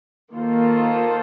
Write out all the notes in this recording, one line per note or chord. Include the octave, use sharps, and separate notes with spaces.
D#3 A#3 F4 A4 C5